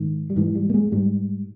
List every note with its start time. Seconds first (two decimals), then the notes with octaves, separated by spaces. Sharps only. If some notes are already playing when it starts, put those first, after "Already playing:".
Already playing: G#2 D#3
0.30 G3
0.36 G#2 E3
0.55 G3
0.69 A#3
0.74 G#3
0.92 G#2 G3